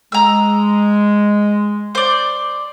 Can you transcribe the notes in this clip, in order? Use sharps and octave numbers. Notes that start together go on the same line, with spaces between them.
G#3 A#5 E6
C5 D5